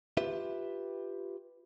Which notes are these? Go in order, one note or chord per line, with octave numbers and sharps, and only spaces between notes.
F4 G4 B4 E5